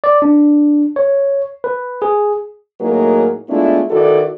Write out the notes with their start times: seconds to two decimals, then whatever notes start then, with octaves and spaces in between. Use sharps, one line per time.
0.04 D5
0.22 D4
0.96 C#5
1.64 B4
2.02 G#4
2.81 A2 F#3 A#3 D#4 G#4 A#4
3.49 G#3 A3 B3 D4 E4 F4
3.91 D#3 E4 F#4 A4 B4 D5